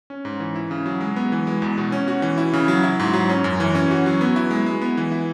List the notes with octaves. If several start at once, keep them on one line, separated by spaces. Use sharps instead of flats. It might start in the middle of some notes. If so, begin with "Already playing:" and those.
C#4
G#2
E3
E4
C#3
F#3
G#3
B3
E3
G#3
E2
B2
C#4
F#4
E3
E4
C#3
F#3
E4
G#2
F#3
C#4
F#2
E3
C#4
F#4
F#3
B3
E4
G#3
G#3
B3
E3
E4